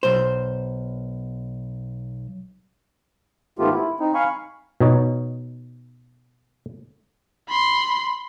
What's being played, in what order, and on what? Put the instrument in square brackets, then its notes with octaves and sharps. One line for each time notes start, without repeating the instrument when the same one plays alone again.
[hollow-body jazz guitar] B1 C5
[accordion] G#2 D#3 A3 B3 F4 G4
E4
C4 D#4
F5 G#5 B5 C#6
[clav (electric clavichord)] B2 D#4 C#5
[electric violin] B5 C6